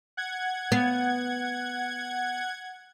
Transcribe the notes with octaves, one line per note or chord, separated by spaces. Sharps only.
F#5 G#6
B3